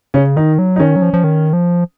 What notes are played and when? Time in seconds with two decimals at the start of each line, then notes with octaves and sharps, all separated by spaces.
0.14 C#3 C#4
0.36 D#3 D#4
0.59 F#3
0.76 D#4
0.80 D#3 C#4
0.96 F#3
1.02 F3
1.14 F3
1.24 D#3
1.53 F3